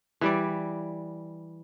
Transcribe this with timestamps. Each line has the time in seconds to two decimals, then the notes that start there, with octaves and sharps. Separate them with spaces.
0.21 E3 G3 D5